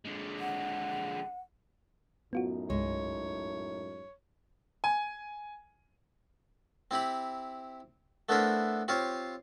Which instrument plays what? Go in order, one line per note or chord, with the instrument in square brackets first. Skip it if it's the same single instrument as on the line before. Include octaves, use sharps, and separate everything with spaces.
[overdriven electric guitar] D3 G#3
[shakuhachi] F#5
[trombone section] F#2 A2 D#4 [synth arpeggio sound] B3 F4 F#4
[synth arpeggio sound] C2 G2 [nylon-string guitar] G#3 [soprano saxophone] C#5
[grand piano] G#5
[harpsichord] C4 E4 G4 B5
A3 B3 D4 E4 A#4 C5
C4 F4 G4 C5 C#5 F5